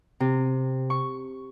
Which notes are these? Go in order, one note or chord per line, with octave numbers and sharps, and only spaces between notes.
C3
C#6